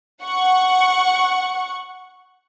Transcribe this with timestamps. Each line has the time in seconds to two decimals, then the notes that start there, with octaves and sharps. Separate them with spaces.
0.23 F#5 C#6